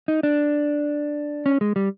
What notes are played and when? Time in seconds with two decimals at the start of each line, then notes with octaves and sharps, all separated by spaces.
0.08 D#4
0.23 D4
1.46 C#4
1.61 G#3
1.76 G3